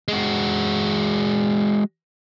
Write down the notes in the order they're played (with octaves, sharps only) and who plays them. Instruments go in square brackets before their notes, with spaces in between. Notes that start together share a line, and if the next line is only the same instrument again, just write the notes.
[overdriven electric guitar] G#3 F#4